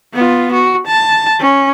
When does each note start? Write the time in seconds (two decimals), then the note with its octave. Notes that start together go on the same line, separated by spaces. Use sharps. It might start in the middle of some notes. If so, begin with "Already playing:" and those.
0.14 B3 F4
0.53 F#4
0.87 A5
1.40 C#4